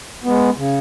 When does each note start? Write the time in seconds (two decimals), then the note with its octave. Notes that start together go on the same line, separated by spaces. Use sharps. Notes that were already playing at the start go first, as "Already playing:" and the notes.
0.24 G#3 B3
0.57 C#3